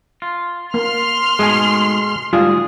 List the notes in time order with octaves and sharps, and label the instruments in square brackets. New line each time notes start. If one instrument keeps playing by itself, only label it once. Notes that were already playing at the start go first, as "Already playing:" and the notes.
[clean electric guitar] F4
[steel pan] A#3 [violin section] C6 F6
[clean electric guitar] G#2 B2 A3 [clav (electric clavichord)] G#3 G#5
[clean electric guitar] D2 G#2 G#4 [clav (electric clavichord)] G3 [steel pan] F4